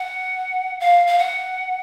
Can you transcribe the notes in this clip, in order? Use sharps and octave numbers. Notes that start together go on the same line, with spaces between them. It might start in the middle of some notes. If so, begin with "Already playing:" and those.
Already playing: F#5
F5
F5
F#5